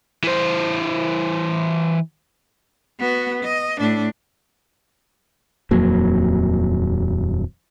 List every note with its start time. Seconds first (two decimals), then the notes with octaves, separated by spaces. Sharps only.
0.24 E3 C5
2.99 B3 F#4
3.43 D#5
3.80 A2 D4
5.71 D#1 F2 F#3 A#3